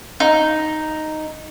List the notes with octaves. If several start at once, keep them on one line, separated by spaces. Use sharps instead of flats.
D#4